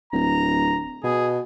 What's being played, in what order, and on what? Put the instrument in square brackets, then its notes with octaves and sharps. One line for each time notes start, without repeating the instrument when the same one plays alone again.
[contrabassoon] D1 [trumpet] A#5
[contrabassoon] B2 [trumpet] G#4